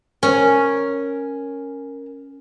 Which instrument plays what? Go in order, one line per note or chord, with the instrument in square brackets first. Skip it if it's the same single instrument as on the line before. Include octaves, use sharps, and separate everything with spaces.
[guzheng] C#4 [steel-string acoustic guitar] A#4 G#5